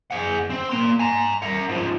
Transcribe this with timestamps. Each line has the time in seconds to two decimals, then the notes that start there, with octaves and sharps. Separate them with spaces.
0.11 G#4 F#5
0.50 C4
0.69 A#3 C6
0.99 G#5 A#5
1.42 A#4 F#5
1.69 G#2 F3